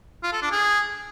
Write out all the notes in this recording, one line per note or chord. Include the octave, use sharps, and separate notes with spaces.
F4
A4
D4
G#4